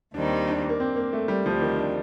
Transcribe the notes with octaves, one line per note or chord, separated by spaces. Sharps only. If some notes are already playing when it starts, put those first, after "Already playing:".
D#2 D#3 G3 C4 D4 D#4
D4
A#3
C4
A#3
A3
G3
D2 C3 F3 G3
D#3
D4